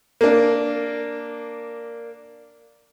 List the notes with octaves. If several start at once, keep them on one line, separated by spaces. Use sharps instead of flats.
A#3 D4